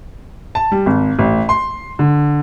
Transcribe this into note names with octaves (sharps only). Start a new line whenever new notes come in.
A5
G3
G#1
A1
C6
D3